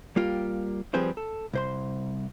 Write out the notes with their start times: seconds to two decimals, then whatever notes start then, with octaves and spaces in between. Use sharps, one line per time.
0.16 G3 A#3 F4 G4
0.94 F3 G3 C4 G#4 B4 C5
1.17 A4
1.53 C2 C5 C6